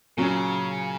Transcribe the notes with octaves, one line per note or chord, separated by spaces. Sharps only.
A#2 C#3 F#3 C#4